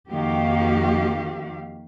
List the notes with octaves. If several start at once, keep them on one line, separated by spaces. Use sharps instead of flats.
F2 D#3 A#3 F#4 G4 F5